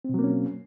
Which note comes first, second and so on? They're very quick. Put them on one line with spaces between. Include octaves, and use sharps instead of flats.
C4 B2 F#3 A#3 C#4